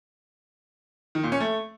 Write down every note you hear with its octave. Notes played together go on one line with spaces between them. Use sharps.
D#3
A#2
C#4
A3